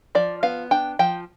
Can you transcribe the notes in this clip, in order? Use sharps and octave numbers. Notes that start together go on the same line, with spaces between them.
F3 D5
B3 F5
D4 G5
F3 G5